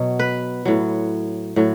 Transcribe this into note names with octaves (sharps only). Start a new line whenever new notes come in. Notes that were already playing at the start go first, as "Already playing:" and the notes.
Already playing: B2 F#3
B4
A2 F#3
A2 F#3